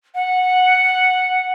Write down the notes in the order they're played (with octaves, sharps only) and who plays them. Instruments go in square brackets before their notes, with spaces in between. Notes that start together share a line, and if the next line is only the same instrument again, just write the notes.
[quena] F#5